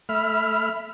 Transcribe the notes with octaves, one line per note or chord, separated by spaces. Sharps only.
A3 E5 B5 F6